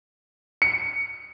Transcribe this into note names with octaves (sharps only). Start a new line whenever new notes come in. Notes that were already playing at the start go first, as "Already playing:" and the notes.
C#7